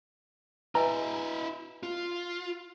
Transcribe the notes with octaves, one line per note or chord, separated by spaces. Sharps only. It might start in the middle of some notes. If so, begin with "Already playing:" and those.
E4 B4 D#5 E5 G#5 A#5
F4